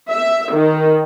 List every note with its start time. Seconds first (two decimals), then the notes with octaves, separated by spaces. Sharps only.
0.10 E5
0.53 D#3